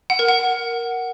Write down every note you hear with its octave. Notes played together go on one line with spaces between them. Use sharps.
F#5
A#4
F#5